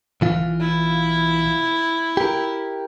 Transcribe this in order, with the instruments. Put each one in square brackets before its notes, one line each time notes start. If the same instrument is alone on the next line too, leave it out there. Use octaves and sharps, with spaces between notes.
[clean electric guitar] B1 E3 F4
[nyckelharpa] E4
[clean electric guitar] G4 A#4